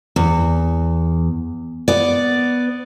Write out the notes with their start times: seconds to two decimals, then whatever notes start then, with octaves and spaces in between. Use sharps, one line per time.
0.16 E2
1.88 B3 D5